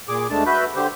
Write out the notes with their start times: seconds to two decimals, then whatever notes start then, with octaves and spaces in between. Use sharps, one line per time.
0.08 A#2 G#4 D6
0.30 D2 G#3 A3 D4 A5
0.46 F#4 B4 E5 B5 G6
0.75 D3 G4 C5